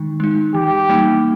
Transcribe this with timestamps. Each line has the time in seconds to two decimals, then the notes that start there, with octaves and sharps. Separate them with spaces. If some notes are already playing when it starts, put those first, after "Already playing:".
Already playing: D#3 G#3 D#4
0.20 G#3 D#4
0.54 E3 G4
0.89 G3 A#3 D#4